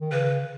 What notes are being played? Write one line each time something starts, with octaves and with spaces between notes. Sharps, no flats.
D#3
C#3 B4